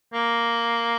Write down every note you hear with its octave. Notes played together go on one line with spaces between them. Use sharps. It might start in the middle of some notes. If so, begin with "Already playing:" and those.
A#3